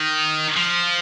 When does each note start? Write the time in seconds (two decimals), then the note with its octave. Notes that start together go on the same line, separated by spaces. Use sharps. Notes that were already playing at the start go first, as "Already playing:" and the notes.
Already playing: D#3
0.56 F3